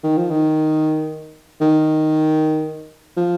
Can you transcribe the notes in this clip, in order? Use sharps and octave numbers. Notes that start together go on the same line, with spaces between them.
D#3
F3
D#3
D#3
F3